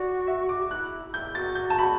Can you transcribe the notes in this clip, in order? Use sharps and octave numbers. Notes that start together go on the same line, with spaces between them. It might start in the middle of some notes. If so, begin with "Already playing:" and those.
Already playing: F#4 D5
E5
D6
E4 F#6
E4 G6
F#4 A6
G6
A5
B5